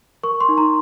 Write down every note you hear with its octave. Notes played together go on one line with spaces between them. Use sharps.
A#4 C#6
C6
D#4
A#5